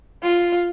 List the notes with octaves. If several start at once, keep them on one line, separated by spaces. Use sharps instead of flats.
F4